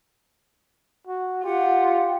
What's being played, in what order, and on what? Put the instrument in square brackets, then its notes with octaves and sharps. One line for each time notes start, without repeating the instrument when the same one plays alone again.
[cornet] F#4
[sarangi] F4 [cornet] G4 [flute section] F#5